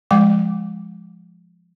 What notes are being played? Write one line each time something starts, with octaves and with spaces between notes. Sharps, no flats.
F3 G#3 G5 D6